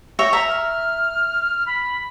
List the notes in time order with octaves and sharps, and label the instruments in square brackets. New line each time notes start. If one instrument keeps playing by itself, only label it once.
[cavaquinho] C#5 E5 G5 [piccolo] A#6
[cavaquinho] E5 A#5 [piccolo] B6
[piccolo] F6
B5